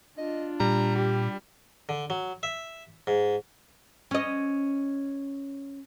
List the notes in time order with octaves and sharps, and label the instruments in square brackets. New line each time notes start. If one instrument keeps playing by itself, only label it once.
[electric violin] D4 F4 [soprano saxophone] D#5
[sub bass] A#2 [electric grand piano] G3 [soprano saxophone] A#5
[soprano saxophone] G4
[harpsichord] D3
F#3
E5
G#2
[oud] C#4 D#5